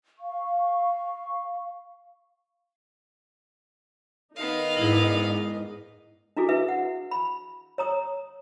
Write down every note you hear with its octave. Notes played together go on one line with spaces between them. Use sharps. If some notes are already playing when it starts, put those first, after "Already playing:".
F5 C#6
D#3 B3 D#4 D#5 F5
G#2 E4 G#4
D4 E4 F#4 G#4 A4
E4 B4 E5
F#5
B5
C#5 A#5 D#6